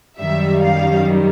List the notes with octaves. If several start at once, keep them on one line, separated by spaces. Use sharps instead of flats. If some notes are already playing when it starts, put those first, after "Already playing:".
F#2 D#3 G3 E5
F5